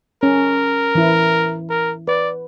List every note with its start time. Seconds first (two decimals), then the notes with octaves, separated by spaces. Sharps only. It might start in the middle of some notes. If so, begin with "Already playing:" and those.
0.23 C#4 A#4
0.95 E3 E4
1.70 A#4
2.08 B4 D5